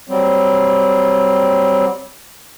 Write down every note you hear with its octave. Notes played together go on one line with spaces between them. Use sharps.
F#3 G3 C4